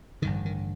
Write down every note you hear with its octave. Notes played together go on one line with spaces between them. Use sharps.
A1 G2 D3 D#3
D#3